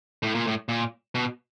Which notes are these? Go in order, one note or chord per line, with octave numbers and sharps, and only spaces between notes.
A2
A#2
A2
A#2
B2